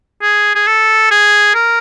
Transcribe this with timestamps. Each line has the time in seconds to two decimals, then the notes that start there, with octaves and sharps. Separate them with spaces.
0.22 G#4
0.55 G#4
0.67 A4
1.11 G#4
1.55 A#4